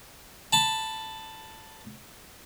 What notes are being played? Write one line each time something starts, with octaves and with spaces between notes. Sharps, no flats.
A5 B5